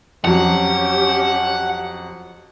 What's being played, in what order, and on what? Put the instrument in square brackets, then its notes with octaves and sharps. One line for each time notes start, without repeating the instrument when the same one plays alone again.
[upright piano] F2 F#3 [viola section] C#4 G4 [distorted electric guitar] F#5